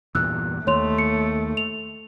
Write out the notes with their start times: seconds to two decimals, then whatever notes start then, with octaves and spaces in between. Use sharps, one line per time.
0.15 E2 G2 A#2 E6 F#6
0.67 D#2 A3 C#5 C6 F7
0.99 C#7
1.57 F7